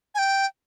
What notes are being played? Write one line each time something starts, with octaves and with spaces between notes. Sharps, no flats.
G#5
G5